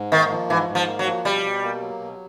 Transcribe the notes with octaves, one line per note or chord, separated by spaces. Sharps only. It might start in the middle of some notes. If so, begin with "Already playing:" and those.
Already playing: G#2
D#3 A#3
F3
G#2 E3
G#2
F3
A#3
F#3
F3
B2 G3
B2
A#3
F#3
B2